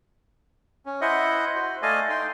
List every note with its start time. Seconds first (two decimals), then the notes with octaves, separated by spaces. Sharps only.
0.86 C#4
1.01 E4 C5 D#5 E5 F#5
1.55 F#4 C5
1.82 A3 A4 D5 D#5 F5 G#5
2.09 D#4 G5 C6